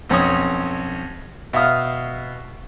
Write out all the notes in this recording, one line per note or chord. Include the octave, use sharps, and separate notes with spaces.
B1 F2 C#4 C#5 D#6
B2 E5 F5 D#6 F6